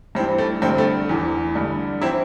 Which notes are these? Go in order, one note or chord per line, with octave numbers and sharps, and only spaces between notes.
G2 E3 C4
A3
G2 D3 C4
A3
E2 E3
G2 D3
E3 C4 E4